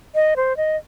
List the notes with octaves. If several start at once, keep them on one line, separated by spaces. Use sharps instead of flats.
D#5
C5
D#5